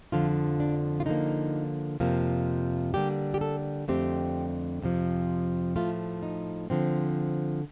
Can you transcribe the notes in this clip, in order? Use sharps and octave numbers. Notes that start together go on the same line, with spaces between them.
F2 D3 F3 F4
D4
F4
D3 F3 A#3 D#4
F2 C3 F3 A#3
D3 G3 A#3 G4
G4
A4
F2 D3 A3 C4 G4
F2 C3 F3
A2 F3 A3 F4
D#4
D3 F3 C4